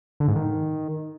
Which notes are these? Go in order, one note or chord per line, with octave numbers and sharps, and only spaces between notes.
D3
G#2
D#3